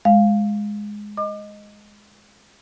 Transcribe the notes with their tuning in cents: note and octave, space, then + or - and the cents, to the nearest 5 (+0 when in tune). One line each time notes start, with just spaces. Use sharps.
G#3 +0 F5 +0
D#5 +0 D6 +35